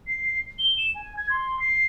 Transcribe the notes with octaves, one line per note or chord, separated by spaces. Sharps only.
C7
G7
E7
G#5
G#6
C6
C7